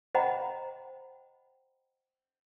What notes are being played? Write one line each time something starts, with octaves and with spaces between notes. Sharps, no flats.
C5 D#5 F#5 G5 A#5 B5